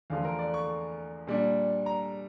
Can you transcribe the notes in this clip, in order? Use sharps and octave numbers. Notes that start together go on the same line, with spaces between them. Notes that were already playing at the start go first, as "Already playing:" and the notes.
E2 D3 F3 A3 F5
A#4
D5
C#6
A#2 G3 D4
A#5